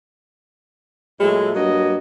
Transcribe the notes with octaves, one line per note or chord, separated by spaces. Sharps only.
A#2 F#3 G#3 A3 E4
G2 F#3 A#3 F#4 D#5